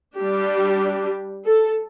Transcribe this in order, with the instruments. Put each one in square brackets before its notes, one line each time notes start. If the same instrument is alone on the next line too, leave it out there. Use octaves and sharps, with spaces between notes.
[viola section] G3 D4 G4
A4